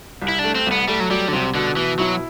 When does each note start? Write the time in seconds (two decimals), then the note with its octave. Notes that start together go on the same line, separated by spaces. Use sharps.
0.22 C2
0.28 E4
0.39 D4
0.44 A3
0.55 C4
0.67 C2
0.72 B3
0.88 G3 A3
1.00 F#3
1.10 F#3 G3
1.28 D3
1.33 C2 C3
1.55 B2 D3
1.77 B2 E3
1.99 F#3 E4